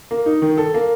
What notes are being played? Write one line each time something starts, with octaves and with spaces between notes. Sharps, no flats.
A#3
D#4
D#3
A4
A#3